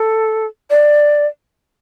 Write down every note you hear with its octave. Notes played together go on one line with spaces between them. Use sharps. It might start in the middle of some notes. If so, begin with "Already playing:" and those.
Already playing: A4
D5